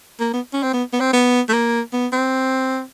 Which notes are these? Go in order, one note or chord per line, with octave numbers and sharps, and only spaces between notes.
A#3
B3
C#4
C4
B3
B3
C4
B3
A3
A#3
B3
C4